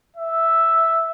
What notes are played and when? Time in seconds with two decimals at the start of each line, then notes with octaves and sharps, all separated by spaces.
0.16 E5